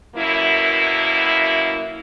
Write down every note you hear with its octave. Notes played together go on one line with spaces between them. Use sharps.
F#2 B2 A#3 E4